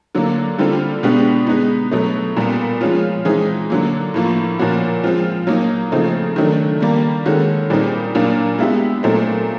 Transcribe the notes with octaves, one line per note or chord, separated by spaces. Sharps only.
D3 F#3 A#3
D3 G3 C4 F4 A4
B2 G#3 B3 D4 G4
G#3 B3 D#4
B2 F#3 A3
A#2 G3 B3
F3 G#3 C#4 F4
E3 G#3 C4 D#4 G#4
D3 F#3 A#3
A2 F3 A#3
A#2 F3 A#3 C#4 F#4
F3 G#3 C4 F4
F#3 A#3 D#4
C#3 F3 A3 C4 D#4
D#3 F#3 A3 D4
D#3 G3 A#3
D#3 G#3 C#4 F#4 A4
A#2 G3 C4 D#4 G#4
A#2 F#3 A#3 D4 F4
G#3 B3 E4 G4
A#2 F#3 A3 C4